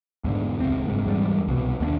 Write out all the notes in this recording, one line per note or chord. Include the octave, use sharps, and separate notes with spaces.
E2 G#2 D3
D#1 C#2 C4
F#1 G#2
E2 G#2 G3
C2 B2
D#2 B3 D4